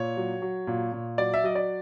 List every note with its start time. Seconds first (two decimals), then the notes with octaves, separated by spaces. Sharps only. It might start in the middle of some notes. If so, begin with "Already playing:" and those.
Already playing: A#2 C#5
0.17 F#3
0.42 F#3
0.67 A#2
0.92 A#2
1.18 F#3 D5
1.34 E5
1.44 F#3 D#5
1.55 D5